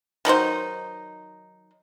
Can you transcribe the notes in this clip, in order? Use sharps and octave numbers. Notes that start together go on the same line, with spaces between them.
D#3 F#3 D#4 C5